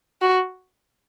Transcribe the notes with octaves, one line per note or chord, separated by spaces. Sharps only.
F#4